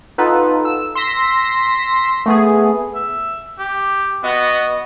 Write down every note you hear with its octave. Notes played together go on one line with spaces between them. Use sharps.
B3 D#4 F4 A4 B4
E6
C6 E6 A#6 B6
A3 B3 G#4
E5
G4
B3 F#4 D#5